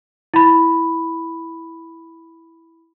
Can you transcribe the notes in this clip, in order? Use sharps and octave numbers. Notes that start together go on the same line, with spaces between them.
E4 B5